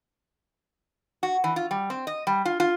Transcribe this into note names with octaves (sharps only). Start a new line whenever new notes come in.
F#4
E3
F4
G3
C4
D#5
G3
F4
F4